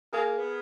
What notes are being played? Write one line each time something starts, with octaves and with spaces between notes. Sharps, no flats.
A#3 G#4 A#4
B3